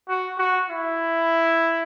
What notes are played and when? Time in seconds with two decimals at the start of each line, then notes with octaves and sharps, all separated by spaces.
0.09 F#4
0.38 F#4
0.69 E4